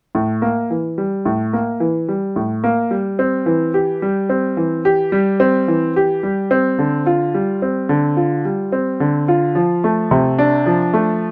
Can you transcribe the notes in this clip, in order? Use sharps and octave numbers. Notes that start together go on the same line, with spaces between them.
A2
A#3
E3
G3
A2
A#3
E3
G3
A2
A#3
G3
C4
E3
G4
G3
C4
E3
G4
G3
C4
E3
G4
G3
C4
D3
F4
G3
C4
D3
F4
G3
C4
D3
F4
F3
A3
C3
D4
F3
A3